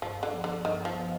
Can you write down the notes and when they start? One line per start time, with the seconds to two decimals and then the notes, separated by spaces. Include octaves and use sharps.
0.02 G2 F3
0.23 D3
0.33 F3 B3
0.44 D3
0.65 G2 D#3
0.85 F3
0.96 F3 B3